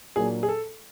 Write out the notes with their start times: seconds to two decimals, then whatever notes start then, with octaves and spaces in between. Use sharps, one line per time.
0.16 A#2 F#3 A#3 D4 G#4
0.43 G#4
0.49 A4